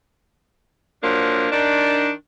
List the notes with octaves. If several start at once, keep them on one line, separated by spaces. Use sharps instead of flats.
F3 F#3 A#3 D4
D#3 D4